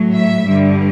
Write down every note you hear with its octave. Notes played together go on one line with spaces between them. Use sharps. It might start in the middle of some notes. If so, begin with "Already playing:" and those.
Already playing: A2 F#3
E5
G2 D3 G3